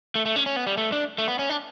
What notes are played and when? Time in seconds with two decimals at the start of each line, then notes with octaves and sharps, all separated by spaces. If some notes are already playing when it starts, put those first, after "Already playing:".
0.15 A3
0.26 A3
0.36 C#4
0.46 C#4
0.56 B3
0.67 G3
0.77 A3
0.92 D4
1.18 A3
1.28 B3
1.39 C#4
1.49 D4